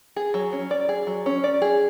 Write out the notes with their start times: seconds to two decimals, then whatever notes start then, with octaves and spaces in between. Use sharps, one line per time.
0.16 G#4
0.34 F#3
0.53 C#4
0.71 D5
0.89 G#4
1.07 F#3
1.26 C#4
1.44 D5
1.62 G#4